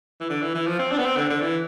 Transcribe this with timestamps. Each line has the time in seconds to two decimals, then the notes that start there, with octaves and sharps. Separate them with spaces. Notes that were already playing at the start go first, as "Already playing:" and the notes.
0.20 E3
0.29 D3
0.41 E3
0.54 E3
0.66 F3
0.79 C4
0.91 D4
0.98 B3
1.04 C4
1.17 D3
1.30 D3
1.42 E3